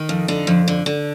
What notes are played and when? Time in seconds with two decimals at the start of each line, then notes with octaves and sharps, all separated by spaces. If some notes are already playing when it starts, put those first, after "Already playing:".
Already playing: D#3
0.09 F2
0.28 D3 D#4
0.47 F2
0.68 D3
0.86 D3